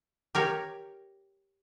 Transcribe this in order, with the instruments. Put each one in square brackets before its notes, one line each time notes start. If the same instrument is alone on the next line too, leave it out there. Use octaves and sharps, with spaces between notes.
[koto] G4 A#4 C#5